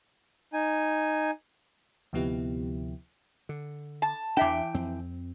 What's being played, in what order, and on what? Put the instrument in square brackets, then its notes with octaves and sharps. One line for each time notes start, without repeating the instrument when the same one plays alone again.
[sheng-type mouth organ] D#4 G#5
[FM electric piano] D2 C3 F3 B3 E4 G4
[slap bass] D3
[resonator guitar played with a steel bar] A5
[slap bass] E2 D4 [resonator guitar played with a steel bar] E3 E5 G5
[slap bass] F2 C4